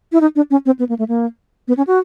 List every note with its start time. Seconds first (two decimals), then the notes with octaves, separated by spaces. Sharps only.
0.12 E4
0.21 D#4
0.36 D4
0.51 C#4
0.66 C4
0.79 B3
0.89 A#3
0.99 A3
1.08 A#3
1.68 B3
1.77 C#4
1.87 F#4